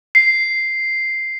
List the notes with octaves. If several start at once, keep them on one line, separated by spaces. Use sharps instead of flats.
C7